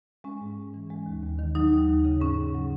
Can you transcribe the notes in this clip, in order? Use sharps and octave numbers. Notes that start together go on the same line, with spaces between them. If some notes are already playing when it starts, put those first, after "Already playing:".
G#3 C#4
G#2
G#2
E3
G#3
D#2
D#2
D#3
F#3 D#4
D#2
D#2
C#3
G#2 C#4
G#2
F#3